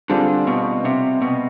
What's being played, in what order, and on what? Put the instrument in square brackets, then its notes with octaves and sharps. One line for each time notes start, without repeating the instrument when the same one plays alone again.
[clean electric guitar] D3 [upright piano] G3 C4 F4 G#4
[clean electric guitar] B2
C3
B2